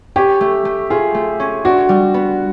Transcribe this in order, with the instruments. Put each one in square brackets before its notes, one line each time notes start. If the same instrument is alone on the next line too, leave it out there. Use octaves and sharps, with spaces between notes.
[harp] C#4 [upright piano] G4
[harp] A3
A3
[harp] F4 [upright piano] G#4
[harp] A3
C#4
[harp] D4 [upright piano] F#4
[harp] G3
B3